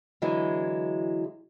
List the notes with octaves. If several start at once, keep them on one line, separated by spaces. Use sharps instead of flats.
D3 E3 F#3 G#3 E4